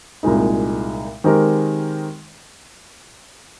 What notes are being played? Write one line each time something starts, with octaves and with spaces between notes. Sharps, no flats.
C2 A#2 G#3 D#4
D#3 G#3 C4 G4 A#4